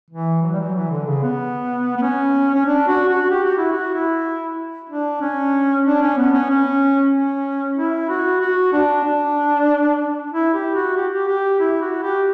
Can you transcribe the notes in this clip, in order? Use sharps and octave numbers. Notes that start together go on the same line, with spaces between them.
E3
F#3
G3
F#3
E3
D3
C#3
B3
B3
C#4
C#4
D4
F#4
F#4
G4
F#4
E4
F#4
E4
D4
C#4
D4
C#4
B3
C#4
C#4
C#4
E4
F#4
F#4
D4
D4
E4
G4
F#4
G4
G4
G4
E4
F#4
G4